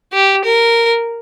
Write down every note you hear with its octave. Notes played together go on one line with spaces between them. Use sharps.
G4
A#4